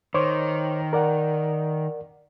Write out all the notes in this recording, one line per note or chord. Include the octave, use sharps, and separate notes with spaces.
D#3 C5 C#5 D6
A#4 D5 F#5